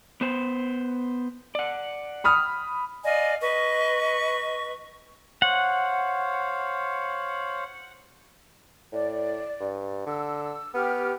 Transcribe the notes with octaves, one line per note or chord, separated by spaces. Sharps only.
B3 C5
D5 F#5
B5 D#6 F6
D5 D#5 F5 G#5
B4 D#5 C#6
C5 C#5 F5 F#5
A2 D5
G2
D3 E6
B3 G4 D6 F6